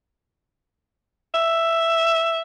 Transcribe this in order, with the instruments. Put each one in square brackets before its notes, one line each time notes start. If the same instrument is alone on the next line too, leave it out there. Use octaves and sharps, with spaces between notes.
[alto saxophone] E5